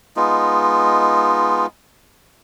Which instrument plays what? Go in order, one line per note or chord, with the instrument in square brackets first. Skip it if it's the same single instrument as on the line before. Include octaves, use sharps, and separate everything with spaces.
[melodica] G#3 B3 D#4 F4